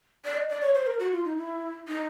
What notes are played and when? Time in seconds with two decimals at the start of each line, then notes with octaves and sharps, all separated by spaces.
0.25 D5
0.37 D#5
0.49 D5
0.61 C#5
0.75 C5
0.87 A#4
0.99 F#4
1.12 F4
1.25 D#4
1.38 E4
1.88 D#4